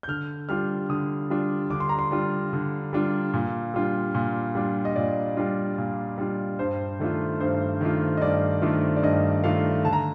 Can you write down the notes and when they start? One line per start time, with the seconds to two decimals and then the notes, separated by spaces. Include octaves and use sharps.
0.03 G6
0.08 D3 F6
0.49 G3 D4 F4 F6
0.89 D3 D#6
1.30 G3 D4 F4
1.70 D3 D6
1.80 C6
1.89 A#5
1.99 C6
2.11 G3 D4 F4
2.53 D3
2.93 G3 D4 F4
3.33 A#2
3.74 G3 D4 F4
4.14 A#2
4.55 G3 D4 F4
4.85 D#5
4.96 A#2 D5
5.37 G3 D4 F4
5.78 A#2
6.18 G3 D4 F4
6.59 G2 C5
7.00 D#3 A3 D4 F4
7.40 G2 C5
7.81 D#3 A3 D4 F4
8.17 D#5
8.21 G2 D5
8.62 D#3 A3 D4 F4
8.97 D5
9.03 G2 D#5
9.44 D#3 A3 D4 F4 F5
9.85 D3 A5
9.93 A#5